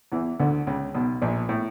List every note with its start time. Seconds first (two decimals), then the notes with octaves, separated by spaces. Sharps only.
0.12 E2 E3
0.40 D2 D3
0.67 C#2 C#3
0.95 B1 B2
1.22 A#1 A#2
1.49 A2